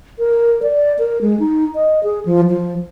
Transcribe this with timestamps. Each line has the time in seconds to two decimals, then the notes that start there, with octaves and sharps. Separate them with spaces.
0.19 A#4
0.63 D5
0.99 A#4
1.21 G#3
1.40 D#4
1.75 D#5
2.03 G#4
2.25 F3
2.49 F3